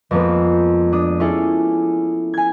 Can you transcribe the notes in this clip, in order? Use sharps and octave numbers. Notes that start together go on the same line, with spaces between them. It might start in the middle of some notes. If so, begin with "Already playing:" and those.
F2 F3 G#3 A#3 B3
D4 D#6
C#4 E4 G#4 A4
G#5 G#6